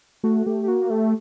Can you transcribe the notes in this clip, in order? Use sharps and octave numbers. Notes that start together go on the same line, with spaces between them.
A3 F#4
A3 G4
G4
A#3 F#4
A3 G4